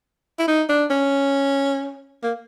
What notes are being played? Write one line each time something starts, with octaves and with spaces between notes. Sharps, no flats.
E4
D#4
D4
C#4
A#3